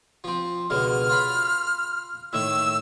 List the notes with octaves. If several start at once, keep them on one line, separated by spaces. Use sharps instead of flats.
F3 C4
C#2 B2 D3 F6
F4 F5 B5
A2 D#3 E6